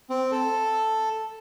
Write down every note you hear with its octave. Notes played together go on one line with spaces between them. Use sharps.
C4
A4